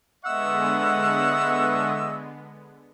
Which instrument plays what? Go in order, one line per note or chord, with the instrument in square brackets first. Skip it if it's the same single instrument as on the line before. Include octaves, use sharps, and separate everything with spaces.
[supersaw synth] D3 G#3 B3 [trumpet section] D#5 E5 C#6 [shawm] F#5 [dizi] E6